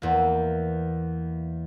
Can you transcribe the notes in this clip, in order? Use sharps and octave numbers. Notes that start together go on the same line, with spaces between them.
E2 A#3